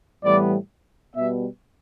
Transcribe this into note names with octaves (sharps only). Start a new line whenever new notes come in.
A2 E3 G3 B3 D5
B2 G3 B3 E5